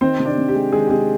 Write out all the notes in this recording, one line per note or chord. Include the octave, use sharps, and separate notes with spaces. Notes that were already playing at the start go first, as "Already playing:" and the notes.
D#3 C4 C5
C3
D4 D5
C3
G4
G#3
D#3 G#3 G#4
G4
C3 G#3 G#4